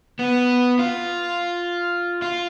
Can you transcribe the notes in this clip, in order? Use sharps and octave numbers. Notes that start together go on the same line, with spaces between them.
B3
F4
F4